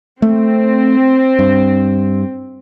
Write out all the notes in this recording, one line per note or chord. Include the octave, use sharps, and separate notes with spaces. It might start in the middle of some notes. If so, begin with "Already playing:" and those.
A3 C4
G2